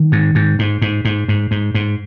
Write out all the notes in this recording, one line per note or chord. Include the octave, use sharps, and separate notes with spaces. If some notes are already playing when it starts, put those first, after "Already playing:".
Already playing: D#3
G#2
G#2
G#2
G#2
G#2
G#2
G#2
G#2